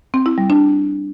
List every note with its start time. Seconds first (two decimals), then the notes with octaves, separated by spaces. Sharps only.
0.14 C4
0.26 E4
0.38 G3
0.50 D4